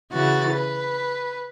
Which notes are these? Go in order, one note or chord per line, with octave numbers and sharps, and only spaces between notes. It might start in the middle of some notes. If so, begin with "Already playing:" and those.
C#3 E3 F#4 A6
B4